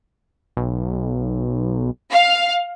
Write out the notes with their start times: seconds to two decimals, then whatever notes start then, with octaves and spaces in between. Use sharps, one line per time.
0.57 B1
2.11 F5